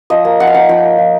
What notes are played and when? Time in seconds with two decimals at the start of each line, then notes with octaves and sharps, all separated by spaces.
0.10 F3 D#5
0.25 A#3
0.40 F3 F#5
0.47 F5
0.54 D#4 F#5
0.69 F3 G5
0.84 A#3
0.98 F3